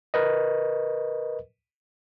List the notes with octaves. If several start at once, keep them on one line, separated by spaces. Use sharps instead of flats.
A#4 B4 D#5